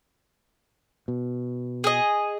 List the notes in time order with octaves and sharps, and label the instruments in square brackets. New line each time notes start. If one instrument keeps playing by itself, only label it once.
[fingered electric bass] B2
[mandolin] G#4 D#5